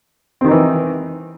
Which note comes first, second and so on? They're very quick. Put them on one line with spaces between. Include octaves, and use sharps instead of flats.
C4 D#3 D#4 E3